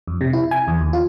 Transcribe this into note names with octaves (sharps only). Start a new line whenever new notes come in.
F2
C3
E4
G#5
E2
D#2
F4